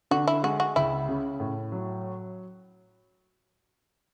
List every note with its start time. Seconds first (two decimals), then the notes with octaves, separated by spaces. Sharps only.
0.11 D3 F#4
0.28 E4
0.43 G#3 F#4
0.60 F#4
0.76 C#2 E4
1.08 C#3
1.40 A2
1.72 F#3